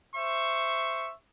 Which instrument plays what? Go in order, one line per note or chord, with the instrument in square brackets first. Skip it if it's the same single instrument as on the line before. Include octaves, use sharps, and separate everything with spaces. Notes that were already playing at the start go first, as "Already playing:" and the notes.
[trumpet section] C5 E5 C#6